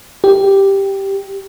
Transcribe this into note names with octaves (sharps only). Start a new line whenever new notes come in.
G4